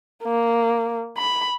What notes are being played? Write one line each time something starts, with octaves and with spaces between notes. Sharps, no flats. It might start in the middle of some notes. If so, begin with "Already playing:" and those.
A#3
B5